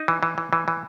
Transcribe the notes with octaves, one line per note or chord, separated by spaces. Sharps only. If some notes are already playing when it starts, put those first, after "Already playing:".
Already playing: D#4
E3
E3
E3
E3
E3